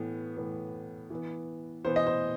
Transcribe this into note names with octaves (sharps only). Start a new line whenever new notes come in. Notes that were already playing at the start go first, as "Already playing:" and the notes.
Already playing: A2 E3 B3
A2 E3 B3
E3 B3
E3 B3 C5
D#5
C5